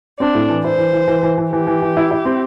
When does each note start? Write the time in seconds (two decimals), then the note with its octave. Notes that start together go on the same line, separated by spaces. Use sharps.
0.20 C4 D4
0.35 A2
0.50 E3
0.64 E4 C5
0.78 E3
0.93 E3
1.07 E3
1.23 E3
1.38 E3
1.52 E3 G4
1.67 E3
1.82 E3
1.97 E4
2.11 E4
2.25 C4